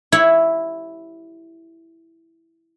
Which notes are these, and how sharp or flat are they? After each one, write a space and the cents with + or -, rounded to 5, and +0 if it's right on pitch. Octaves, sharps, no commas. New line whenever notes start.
E4 +0 G4 -10 C#5 +0